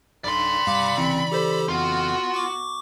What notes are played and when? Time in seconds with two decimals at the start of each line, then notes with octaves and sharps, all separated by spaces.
0.24 B1 G2 D5 B5 C6
0.67 G2 F5 D6
0.98 A1 C#3 E3 C4
1.32 G4 A4 C5
1.69 F2 B3 F4 F#4
2.34 C#6 D6